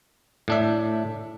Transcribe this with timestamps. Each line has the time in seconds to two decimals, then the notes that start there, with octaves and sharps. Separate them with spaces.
0.48 A2 D4 E5